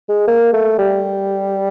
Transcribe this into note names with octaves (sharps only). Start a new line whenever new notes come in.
G#3
A#3
A3
G3